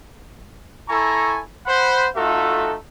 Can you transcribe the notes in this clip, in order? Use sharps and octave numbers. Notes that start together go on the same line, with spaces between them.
E4 A4 G#5 A#5 C#6
C5 F#5 B5
A3 D#4 F4 F#4 A4 E5